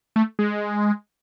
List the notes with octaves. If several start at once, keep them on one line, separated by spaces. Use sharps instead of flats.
A3
G#3